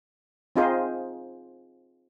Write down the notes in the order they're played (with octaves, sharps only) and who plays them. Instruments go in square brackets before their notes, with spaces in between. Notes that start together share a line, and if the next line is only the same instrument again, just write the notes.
[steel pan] C4 D#4 F4 G#4 C5